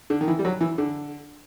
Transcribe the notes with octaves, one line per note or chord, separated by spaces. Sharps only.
D3
D#3
E3
G3
F#3
E3
D3